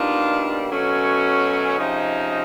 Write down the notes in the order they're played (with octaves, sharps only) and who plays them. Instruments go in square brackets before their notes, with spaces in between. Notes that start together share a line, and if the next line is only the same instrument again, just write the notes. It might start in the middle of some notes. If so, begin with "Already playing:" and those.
Already playing: [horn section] B2 G3 A#3 D4 D#4 F4
B2 F#3 A3 C#4
C3 F3 G#3 C#4 D#4